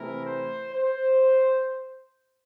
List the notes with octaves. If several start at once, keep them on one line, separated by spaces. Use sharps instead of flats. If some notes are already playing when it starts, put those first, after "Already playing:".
Already playing: C3 E3 A3 C4 E4 A#4
C5
C5